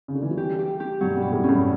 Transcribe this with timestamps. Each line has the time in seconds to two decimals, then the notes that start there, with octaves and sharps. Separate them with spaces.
0.08 C#3
0.15 D3
0.23 E3
0.31 F#3
0.37 E3 G3 G4
0.59 G4
0.80 G4
1.01 G2 B2 F#3
1.17 G2 B2
1.22 G4
1.32 A2
1.43 C#4
1.49 G2